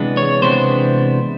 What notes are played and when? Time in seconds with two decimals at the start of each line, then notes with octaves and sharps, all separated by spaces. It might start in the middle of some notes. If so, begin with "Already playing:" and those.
Already playing: C3 E3 G#3 B3 D4
0.17 C#5
0.42 C3 E3 G#3 B3 D4 C5